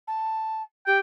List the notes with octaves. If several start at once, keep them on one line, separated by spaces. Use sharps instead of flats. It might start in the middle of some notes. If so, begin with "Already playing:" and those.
A5
G4 G5